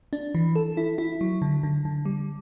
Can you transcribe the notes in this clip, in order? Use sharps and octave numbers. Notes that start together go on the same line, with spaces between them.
D4
E3
A4
E4
E4
F#3
D3
D3
D3
G3